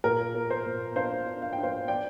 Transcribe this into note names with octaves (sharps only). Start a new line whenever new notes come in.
A#2 A#4
A#3
C5
A#2
D4 C5 F5
D4
F5
G5
D4
C5 F5
D5 G5